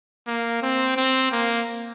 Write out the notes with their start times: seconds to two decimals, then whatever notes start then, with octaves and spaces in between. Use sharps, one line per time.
0.27 A#3
0.62 C4
0.96 C4
1.32 A#3